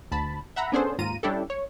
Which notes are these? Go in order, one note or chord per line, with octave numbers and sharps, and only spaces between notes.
D2 A5 B5
E5 F#5 A#5 B5
B3 C#4 D4 G#4 A4 C5
D#2 G#2 F4 A#5 D#7
G3 C#4 D4 E4 G4 A4
C#5